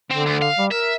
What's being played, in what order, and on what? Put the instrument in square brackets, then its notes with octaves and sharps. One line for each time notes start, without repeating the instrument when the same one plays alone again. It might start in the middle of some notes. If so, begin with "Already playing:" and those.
[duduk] D3 [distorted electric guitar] C4
[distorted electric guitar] D2
F5
[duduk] G3
[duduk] A#4 [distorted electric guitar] E5